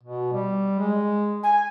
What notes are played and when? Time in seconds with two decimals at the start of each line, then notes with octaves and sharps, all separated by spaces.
0.03 B2
0.33 G3
0.79 G#3
1.43 G#5